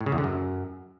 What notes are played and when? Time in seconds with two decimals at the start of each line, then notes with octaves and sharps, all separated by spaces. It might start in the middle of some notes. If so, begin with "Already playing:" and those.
0.01 A2
0.06 C#3
0.12 E2
0.18 D3
0.24 F#2